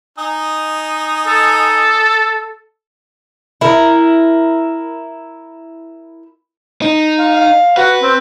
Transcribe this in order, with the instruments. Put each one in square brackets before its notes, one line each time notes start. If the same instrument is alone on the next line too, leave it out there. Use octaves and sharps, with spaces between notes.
[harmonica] D#4 G#5 D#6
[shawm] A4
[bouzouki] E4 A#4
[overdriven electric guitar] D#4
[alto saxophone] F5
F5
[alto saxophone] F#4 [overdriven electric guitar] B4
[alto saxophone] C4